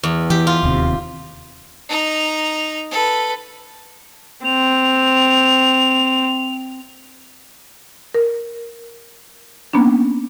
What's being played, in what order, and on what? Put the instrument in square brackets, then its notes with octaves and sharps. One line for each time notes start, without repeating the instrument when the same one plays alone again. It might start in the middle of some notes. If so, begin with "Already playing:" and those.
[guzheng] E2
[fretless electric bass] E3 [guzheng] G4
[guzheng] F4
[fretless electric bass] D1 D#2 C3
[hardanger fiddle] D#4 A#5
A4 B4
[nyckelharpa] C4 [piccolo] F7
[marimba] A#4
A#3 B3 C#4 D4